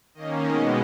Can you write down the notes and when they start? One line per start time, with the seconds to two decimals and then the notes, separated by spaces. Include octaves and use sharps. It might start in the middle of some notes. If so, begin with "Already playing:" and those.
0.14 D#3 A#3 C#4 D#5
0.44 B2 G#3 B3 D#5